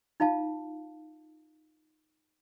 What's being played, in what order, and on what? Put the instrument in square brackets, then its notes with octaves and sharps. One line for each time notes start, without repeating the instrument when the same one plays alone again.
[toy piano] D#4 F4 F5 A5